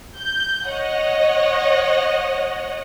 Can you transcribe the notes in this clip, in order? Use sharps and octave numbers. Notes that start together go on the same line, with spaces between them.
G6
C#5 D#5 F#5